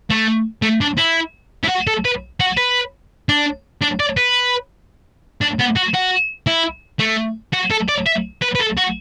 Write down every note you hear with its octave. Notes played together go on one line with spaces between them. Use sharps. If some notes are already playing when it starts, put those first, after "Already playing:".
A3
A3
D4
E4
E4
F#4
A4
B4
F#4
B4
D4
D4
D5
B4
D4
B3
F#4
F#4
E4
A3
F#4
A4
D5
E5
B4
B4
A4
F#4